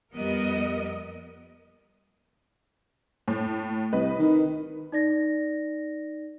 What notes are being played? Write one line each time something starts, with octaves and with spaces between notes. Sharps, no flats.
F2 G3 B3 A#4 D#5
A2
C2 B4 D#5
D#3
D#4 D5 A#6